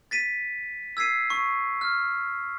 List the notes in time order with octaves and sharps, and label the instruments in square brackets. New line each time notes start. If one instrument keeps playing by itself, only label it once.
[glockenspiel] A6 B6 D#7
E6 G#6 B6 C7 D#7
C#6
F6